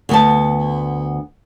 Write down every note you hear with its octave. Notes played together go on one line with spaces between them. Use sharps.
D2 B3 A5